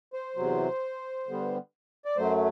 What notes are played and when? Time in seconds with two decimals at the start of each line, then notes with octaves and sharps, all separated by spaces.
0.13 C5
0.36 E2 C3 F#3
1.26 G2 D3 G3 B3
2.05 D5
2.17 F#2 F#3 A3 C5